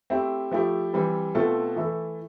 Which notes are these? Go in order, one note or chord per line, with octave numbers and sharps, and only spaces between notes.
A3 C4 E4 G4
F3 A3 E4 G4
E3 G3 C4
B2 A3 C4 F4 A4
E3 A3 E4 A4